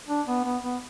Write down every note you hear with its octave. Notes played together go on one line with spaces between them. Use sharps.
D4
B3
B3
B3